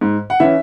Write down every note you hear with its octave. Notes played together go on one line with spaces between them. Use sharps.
G#2
F#5
E3 C#4 E5